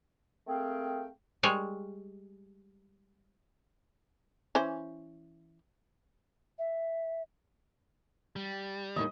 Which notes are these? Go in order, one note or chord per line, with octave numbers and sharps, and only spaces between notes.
A3 A#3 C4 G#4 F5 G5
G3 G#3 C#5
E3 C#4 C5
E5
G3
D#2 A2 D#3 D#5